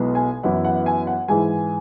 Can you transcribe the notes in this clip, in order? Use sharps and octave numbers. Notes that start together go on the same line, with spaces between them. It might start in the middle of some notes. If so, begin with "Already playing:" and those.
Already playing: B1 B2 G#3 B3 E4
G#5
F#2 E3 B3 E4 F#5
F#5
G#5
F#5
G#2 E3 G#3 G#5